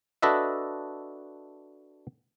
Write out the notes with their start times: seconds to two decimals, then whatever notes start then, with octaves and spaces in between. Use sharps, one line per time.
0.22 D4 F#4 A4 B4 D#5 E5